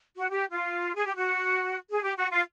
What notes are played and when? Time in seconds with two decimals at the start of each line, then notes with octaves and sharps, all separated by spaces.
0.18 F#4
0.29 G4
0.51 F4
0.95 G#4
1.05 G4
1.16 F#4
1.91 G#4
2.02 G4
2.16 F#4
2.31 F4